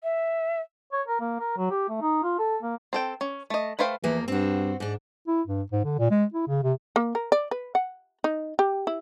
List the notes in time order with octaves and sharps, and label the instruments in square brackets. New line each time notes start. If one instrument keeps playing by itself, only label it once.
[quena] E5
[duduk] C#5
A#4
A#3
A#4
F#3
G4
A3
D#4
F4
A4
A#3
[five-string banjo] C4 A4 G5
C#4
A3 D#5
A3 B4 C5 F5 G5
[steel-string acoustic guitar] E2 F3 A#3 [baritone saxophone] E3
[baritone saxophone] G2 [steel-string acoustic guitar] C4 F#4
[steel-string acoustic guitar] G#2 D4
[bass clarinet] E4
G2
G#2
D3
A#2
G#3
E4
C#3
C3
[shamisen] A#3
A#4
D5
B4
F#5
D#4
G4
E4